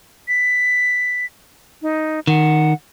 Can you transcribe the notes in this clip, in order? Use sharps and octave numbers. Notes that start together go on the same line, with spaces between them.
B6
D#4
D#3 F#5